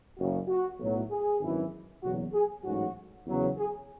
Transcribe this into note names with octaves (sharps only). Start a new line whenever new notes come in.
F#1 F#2 C#3 F#4
F#4
B1 A2 F#3
G#4
G#1 F#2 E3
F#1 E2 B2 F#3 F#4
G#4
A1 G#2 F#3 F#4
E2 C#3 F#3
G#4